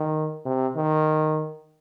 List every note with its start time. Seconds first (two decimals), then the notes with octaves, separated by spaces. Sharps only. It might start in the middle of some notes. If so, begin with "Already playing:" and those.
Already playing: D#3
0.45 C3
0.76 D#3